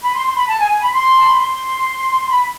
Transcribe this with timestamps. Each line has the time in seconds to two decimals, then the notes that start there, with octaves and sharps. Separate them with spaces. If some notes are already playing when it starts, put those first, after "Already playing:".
0.02 B5
0.14 C6
0.25 C6
0.36 B5
0.48 A5
0.60 G#5
0.70 G#5
0.81 B5
0.93 C6
1.17 A5
1.28 B5
1.39 C6
2.29 B5